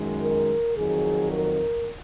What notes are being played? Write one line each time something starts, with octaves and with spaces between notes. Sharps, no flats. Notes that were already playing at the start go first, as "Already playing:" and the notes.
Already playing: F#2 D#3 G#3
A#4
F2 D#3 F#3 G#4
A#4